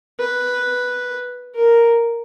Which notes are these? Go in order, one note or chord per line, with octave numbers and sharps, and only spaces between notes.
B4
A#4